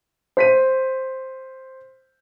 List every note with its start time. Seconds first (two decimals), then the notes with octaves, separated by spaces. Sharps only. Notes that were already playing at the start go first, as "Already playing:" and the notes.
0.37 C5 B6 D#7